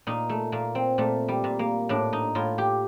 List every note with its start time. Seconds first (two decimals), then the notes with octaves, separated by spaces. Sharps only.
0.07 A#2 D#4
0.29 A3
0.52 A#2 A#3
0.75 C4
0.98 A#2 A3
1.28 G3
1.44 A#2
1.59 A#3
1.89 A2 D4
2.13 D#4
2.35 A2 F4
2.58 G4